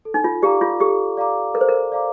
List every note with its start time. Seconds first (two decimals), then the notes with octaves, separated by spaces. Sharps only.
0.05 A4
0.14 D#4
0.24 F4
0.42 G4 D5 F5 A#5 D6
0.61 F4
0.80 G4 A4
1.17 D5 F5 A#5 D6
1.54 A4 A#4
1.61 C5
1.69 A#4
1.92 D5 F5 A#5 D6